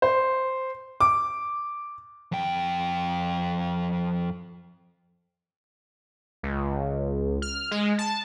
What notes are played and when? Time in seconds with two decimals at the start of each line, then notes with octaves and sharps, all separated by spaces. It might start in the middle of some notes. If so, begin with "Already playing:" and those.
0.02 C5
1.00 D6
2.32 F2 G5
6.43 C#2
7.42 F6
7.71 G#3
7.98 A5